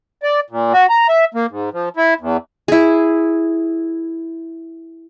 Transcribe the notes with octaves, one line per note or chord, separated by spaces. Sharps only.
D5
A#2
F#4
A#5
E5
A#3
G#2
F3
E4
E2
E4 G#4